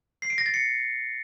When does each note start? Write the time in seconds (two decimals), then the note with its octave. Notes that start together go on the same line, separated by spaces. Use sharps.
0.22 C7
0.30 D7
0.38 A#6
0.46 A6
0.54 C#7